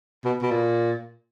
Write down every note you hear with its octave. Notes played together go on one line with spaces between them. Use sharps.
B2
B2
A#2